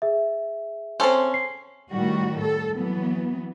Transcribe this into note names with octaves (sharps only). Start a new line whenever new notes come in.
G#4 E5
C4 C#4 A4 C5
C7
A2 D#3 G3 F#4
A4
E3 F#3 B3